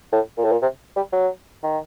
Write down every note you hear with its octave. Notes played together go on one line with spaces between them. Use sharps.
A2
A#2
A2
A#2
C3
G3
F#3
D#3